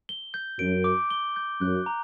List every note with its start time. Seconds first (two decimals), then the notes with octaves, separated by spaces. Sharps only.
0.09 G7
0.34 G6
0.59 F#2 D7
0.84 D6
1.10 G7
1.36 G6
1.61 F#2 F#6
1.86 A#5